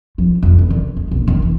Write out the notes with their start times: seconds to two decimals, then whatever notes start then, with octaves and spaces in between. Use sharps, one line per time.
0.18 F3
0.43 F2
0.59 E3
0.70 D3
0.97 G#3
1.11 A#1
1.28 D#3
1.42 E3